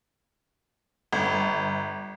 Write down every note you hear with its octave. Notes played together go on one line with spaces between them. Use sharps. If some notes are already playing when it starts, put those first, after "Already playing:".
G1